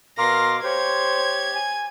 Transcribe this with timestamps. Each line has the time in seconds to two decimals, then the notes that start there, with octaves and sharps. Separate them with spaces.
0.18 B2 A#4 F5 C6 D6 A#6
0.64 G4 C5 C#5 G#6
1.54 G#5